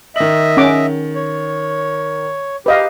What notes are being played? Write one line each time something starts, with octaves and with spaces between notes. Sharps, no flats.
D#3 D#5 E5 F#7
C#4 F#5 D6
C#5
G4 B4 D#5 F5